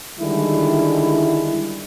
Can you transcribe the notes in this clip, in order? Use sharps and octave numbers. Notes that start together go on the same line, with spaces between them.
D3 D#3 G3 G#3 E4